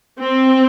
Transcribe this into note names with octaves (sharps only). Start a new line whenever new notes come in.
C4